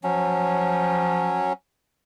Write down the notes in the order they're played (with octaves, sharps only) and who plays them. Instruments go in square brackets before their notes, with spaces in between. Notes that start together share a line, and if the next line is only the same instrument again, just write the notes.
[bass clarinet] F3 [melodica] F#3 C#4